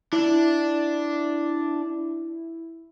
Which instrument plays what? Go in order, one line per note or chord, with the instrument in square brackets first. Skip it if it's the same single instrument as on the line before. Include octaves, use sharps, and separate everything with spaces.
[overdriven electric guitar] D4 [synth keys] E4